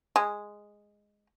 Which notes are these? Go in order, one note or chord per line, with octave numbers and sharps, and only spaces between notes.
G#3